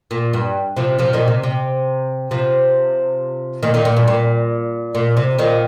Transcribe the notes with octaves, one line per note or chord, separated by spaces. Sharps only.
A#2
G2
C3 F3
C3 F3
A#2 D#3
C3
C3
C3 F3
A#2 D#3
A#2 D#3
A#2
G2
A#2
A#2
C3
A#2 D#3